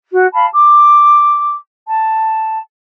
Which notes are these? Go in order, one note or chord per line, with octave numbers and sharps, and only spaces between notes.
F#4
F5 A5 B5
D6
A5